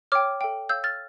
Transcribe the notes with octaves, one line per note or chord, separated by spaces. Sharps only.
C#5 G5 D6 F6
A4 E5 G5
C#5 F5 E6 G6
F6 A6